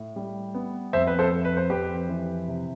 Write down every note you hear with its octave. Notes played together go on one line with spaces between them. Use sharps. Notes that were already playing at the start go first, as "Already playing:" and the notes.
Already playing: A2
G3
B3
F2 C5 E5
B4
A4 C5
F2
B4
C5
F2 G4 B4
E3
C3